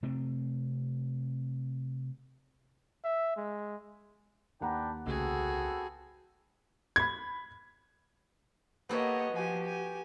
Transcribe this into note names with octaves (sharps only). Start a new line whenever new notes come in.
C3 A3 C4
E5
G#3
D#2 D4 B4 F#5 G5 A#5
C2 C#3 A3 B3 C4 F#4 G#4 A4
B5 G#6
A#3 B3 G4 A4 B4 C#5 D#5
F3 F#4 G4 G#5
G#5